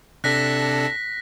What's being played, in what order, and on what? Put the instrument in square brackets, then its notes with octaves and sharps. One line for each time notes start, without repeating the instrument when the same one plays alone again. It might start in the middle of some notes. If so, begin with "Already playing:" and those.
[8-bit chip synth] C3 D4 A4 [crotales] F#6 A#6 B6